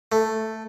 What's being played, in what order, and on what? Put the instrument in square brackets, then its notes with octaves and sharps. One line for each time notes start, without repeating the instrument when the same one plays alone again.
[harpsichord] A3